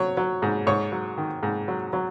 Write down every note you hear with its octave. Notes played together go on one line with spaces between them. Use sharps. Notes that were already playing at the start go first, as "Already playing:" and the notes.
Already playing: F#3 C#5
F#3
G#2
G#2 C#5
F#3
D#3
G#2
F#3
F#3